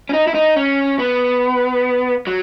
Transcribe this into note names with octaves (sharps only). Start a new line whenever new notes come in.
C#4
D#4
E4
D#4
C#4
B3
F#3